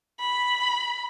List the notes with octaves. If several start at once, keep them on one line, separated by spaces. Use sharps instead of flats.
B5